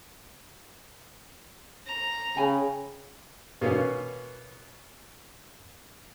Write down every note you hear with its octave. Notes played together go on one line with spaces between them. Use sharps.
A#5
C#3 G5 G#5 B5
B2 A#3 B3 C#4